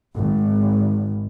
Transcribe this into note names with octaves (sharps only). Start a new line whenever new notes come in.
G#1